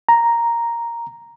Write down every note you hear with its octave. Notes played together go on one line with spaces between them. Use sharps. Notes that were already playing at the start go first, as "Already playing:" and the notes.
A#5